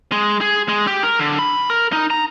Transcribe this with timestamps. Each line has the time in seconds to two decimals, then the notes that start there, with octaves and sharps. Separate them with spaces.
0.12 G#3
0.41 G#4
0.69 G#3
0.87 G4
1.03 A#4
1.19 D3
1.39 B5
1.70 A#4
1.93 D#4
2.10 A#5